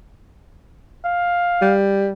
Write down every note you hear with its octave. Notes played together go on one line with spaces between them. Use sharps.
F5
G3